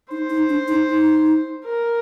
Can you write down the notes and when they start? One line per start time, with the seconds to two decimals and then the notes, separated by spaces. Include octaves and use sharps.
0.11 D#4 C5
0.30 D#4
0.49 D4
0.68 D#4
0.87 D#4
1.64 A#4